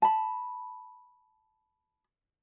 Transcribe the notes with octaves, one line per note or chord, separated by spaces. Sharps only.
A5 B5